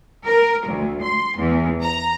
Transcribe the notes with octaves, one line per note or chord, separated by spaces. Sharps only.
A#4
D2
C6
E2
A#5